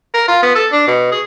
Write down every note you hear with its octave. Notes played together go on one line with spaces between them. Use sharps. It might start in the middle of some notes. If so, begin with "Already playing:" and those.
A#4
F4
B3
A4
D4
B2
G#4